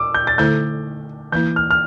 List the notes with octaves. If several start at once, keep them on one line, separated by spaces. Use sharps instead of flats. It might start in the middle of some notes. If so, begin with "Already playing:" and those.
Already playing: D6 E6
G6
A6
D3 A3 E4 A4 C5 G6
E3 A#3 E4 G6
F6
F6